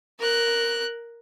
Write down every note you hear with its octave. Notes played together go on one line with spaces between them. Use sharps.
A#4 F#6